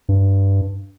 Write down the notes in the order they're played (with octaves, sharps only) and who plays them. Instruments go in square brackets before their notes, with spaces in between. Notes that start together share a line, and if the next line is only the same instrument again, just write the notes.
[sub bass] G2